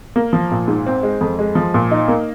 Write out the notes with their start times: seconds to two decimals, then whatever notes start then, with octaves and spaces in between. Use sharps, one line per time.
0.16 A#3
0.33 F3
0.51 A#2
0.68 G#2
0.86 C4
1.03 G#3
1.21 F2
1.39 G#3
1.55 F3
1.74 A#2
1.91 D#4
2.08 A#3